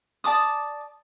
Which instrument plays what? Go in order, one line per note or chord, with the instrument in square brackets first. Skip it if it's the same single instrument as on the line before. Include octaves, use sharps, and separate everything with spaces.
[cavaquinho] D5 A5 D6 D#6